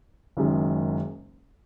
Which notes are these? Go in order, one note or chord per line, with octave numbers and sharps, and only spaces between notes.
F#1 F#2 D#3 G#3